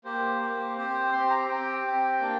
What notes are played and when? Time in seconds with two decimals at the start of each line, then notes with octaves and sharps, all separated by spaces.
0.05 A#3 G4 C5
0.40 A#3 G4
0.76 C4 G4 C5
1.12 C4 G4 C6
1.30 A#5
1.49 C4 G4 G5
1.85 C4 G4
2.21 A#3 D4